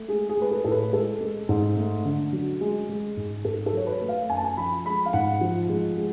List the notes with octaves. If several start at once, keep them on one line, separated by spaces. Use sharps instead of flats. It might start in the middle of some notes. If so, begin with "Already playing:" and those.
Already playing: A3
G#3 G#4
G#4
G#3 B4
A4
A2 A4
B4
G#3 A4
G#3
G#2
A3
D3
F#3
G#3 G#4
G#3
G#2
G#2 A4
A4
F#3 C#5
B4
A3
F5
F#2 G#5
A5
G#5
F3 B5
G#3 B5
F5
G#2 F#5
F3
G#3
G#3